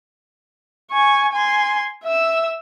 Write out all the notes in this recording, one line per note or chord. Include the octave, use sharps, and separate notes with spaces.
G#5 C#6
G#5 C6
E5 E6